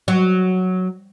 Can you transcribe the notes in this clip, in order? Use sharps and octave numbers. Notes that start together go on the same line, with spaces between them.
F#3